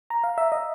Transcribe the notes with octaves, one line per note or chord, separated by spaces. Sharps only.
A#5
F5
E5
D#5